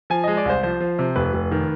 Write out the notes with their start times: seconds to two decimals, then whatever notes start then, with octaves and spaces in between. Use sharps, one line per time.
0.10 F3 G#5
0.24 G#3 D#5
0.37 D5
0.45 C2 C5
0.63 F3 C5
0.80 F3
0.99 C3
1.16 F1 B4
1.34 F1
1.51 D#3